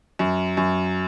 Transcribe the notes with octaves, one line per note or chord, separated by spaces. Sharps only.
F#2
F#2